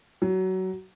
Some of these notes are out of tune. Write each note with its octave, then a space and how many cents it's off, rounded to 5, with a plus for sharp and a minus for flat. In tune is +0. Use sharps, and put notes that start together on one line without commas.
F#3 +20